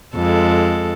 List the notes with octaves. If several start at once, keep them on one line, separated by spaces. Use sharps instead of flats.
F2 G#3 A4